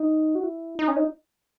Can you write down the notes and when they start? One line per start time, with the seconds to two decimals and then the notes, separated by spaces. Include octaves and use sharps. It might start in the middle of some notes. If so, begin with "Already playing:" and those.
Already playing: D#4
0.35 F#4
0.43 E4
0.79 D#4
0.88 C#4
0.96 D#4